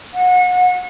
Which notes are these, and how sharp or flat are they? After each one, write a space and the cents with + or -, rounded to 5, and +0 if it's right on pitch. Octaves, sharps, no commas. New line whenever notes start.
F#5 -30